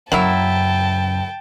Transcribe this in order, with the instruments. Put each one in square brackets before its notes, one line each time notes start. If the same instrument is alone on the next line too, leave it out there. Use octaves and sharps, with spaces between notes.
[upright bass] F#2 C#3 [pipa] F#3 A#3 E4 [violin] G5 A5